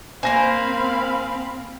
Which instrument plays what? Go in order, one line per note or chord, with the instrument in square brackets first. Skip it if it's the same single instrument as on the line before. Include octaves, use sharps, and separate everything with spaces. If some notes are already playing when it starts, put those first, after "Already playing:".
[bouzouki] A#3 C5 [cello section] C4 [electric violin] F5 B5 [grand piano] G#5 A#6